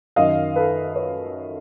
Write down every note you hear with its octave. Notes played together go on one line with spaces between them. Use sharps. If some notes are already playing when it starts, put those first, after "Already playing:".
F#2 D#3 D#5 F5
A4 B4
B4 C#5